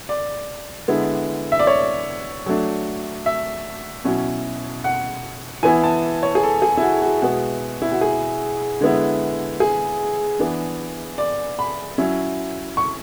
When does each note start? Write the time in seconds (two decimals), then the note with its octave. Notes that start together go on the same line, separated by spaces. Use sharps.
0.09 D5
0.88 D3 G#3 B3 E4
1.52 E5
1.59 D5
1.67 C#5
2.46 F#3 A3 D4
3.26 E5
4.04 B2 F#3 C#4 E4
4.84 F#5
5.63 E3 B3 E4 G#5
5.84 A5
6.23 C#5
6.35 G#4
6.43 A4
6.62 G#4
6.77 E4
6.82 F#4
7.02 F#4
7.22 B2 G#3 B3 E4 F#4
7.82 E4
7.92 F#4
8.01 G#4
8.81 D3 G#3 B3 E4
9.60 G#4
10.39 E3 B3 D4
11.18 D5
11.59 B5
11.98 F#3 C#4 E4
12.77 C#6